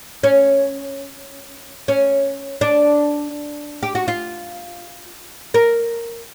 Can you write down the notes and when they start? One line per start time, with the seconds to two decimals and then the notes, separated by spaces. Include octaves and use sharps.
0.23 C#4
1.88 C#4
2.61 D4
3.83 G4
3.95 F#4
4.08 F4
5.54 A#4